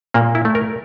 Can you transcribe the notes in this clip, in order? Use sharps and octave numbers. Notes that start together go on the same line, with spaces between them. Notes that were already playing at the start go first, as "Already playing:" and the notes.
A#2 A#3
E4
A3
A#4